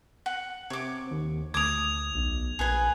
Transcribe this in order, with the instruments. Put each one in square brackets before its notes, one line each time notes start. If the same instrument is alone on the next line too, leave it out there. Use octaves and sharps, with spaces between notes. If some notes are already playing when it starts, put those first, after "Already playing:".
[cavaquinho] F#5
[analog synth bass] C3 [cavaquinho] C#5 D6
[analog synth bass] D#2
[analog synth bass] D2 [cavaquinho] D6 D#6 [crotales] G#6 F7
[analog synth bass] B1
[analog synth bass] A#1 [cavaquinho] G#4 B4 G#5